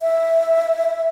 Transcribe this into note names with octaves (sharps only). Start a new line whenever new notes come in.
E5